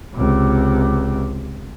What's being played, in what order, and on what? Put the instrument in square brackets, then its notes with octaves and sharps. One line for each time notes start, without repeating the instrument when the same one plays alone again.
[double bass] C#2 C3